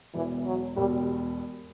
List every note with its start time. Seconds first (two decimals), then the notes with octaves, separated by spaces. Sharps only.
0.14 E1 E2 B2 E3
0.45 F#3
0.76 E1 E2 B2 G3